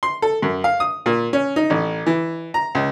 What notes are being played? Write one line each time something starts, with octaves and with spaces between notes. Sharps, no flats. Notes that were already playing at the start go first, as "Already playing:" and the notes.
C6
A4
F#2
F5
D#6
A#2
C#4
D#4
A1
E3
A#5
C#2